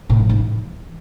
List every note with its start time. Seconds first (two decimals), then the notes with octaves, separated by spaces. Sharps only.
0.10 A2
0.19 F3
0.29 G#2
0.39 E3